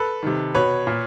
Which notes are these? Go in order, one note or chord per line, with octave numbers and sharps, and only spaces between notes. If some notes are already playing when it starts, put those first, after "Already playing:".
Already playing: A4 B4
C3 D#3
B2 B4 C#5
A#2